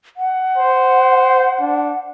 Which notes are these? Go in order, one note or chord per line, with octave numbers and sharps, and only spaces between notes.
F#5
C5
D4